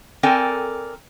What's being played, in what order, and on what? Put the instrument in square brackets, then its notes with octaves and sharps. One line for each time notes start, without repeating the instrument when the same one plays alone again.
[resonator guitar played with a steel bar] C4 A4 A#4 D5 G5 G#5